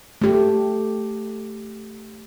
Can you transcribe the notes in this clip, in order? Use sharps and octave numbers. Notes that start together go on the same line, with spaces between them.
A3 G4